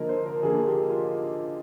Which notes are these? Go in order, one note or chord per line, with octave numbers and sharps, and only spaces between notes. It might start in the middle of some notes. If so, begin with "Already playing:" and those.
Already playing: D3 F3 A#3 A#4 D#5
C5
A#4
D3 F3 A#3 G#4
G4
F4